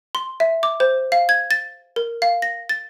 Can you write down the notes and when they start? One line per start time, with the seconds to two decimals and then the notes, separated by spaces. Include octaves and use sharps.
0.15 C6
0.40 E5
0.63 D6
0.80 C5
1.12 F5
1.29 G#6
1.51 A6
1.96 A#4
2.22 F5
2.42 A#6
2.69 A6